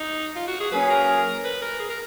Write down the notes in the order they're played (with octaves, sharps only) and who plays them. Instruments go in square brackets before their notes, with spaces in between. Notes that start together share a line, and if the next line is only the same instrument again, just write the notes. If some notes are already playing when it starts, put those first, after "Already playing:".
Already playing: [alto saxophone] D#4
F4
F#4
G#4
[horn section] F#3 A#3 C#4 G#4 [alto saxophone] B4
[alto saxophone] A#4
B4
A#4
G#4
A#4